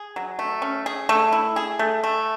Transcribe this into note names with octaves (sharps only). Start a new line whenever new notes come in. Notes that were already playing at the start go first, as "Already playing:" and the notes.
Already playing: G#4
F#3
A3
C#4
G#4
A3
E4
G#4
A3
A3